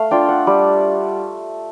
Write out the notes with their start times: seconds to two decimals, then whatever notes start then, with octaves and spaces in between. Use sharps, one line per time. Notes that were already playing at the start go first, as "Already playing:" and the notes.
Already playing: A3 F5
0.11 D4 F4 G5
0.29 F#5
0.47 G3